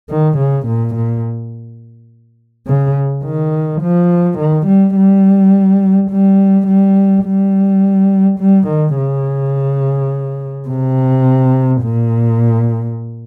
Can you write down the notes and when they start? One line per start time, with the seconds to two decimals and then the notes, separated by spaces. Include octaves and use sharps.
0.10 D#3
0.38 C#3
0.67 A#2
0.95 A#2
2.67 C#3
3.24 D#3
3.82 F3
4.39 D#3
4.67 G3
4.96 G3
6.11 G3
6.68 G3
7.25 G3
8.40 G3
8.68 D#3
8.96 C#3
10.68 C3
11.83 A#2